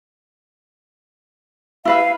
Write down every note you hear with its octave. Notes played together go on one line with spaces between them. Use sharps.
E4 B4 E5 F5